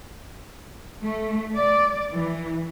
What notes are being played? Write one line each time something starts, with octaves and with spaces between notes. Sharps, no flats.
A3
D5
E3